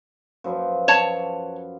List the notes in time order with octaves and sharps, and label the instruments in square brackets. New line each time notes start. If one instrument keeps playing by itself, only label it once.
[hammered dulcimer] F#2 F3 B4
[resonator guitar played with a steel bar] C#5 A5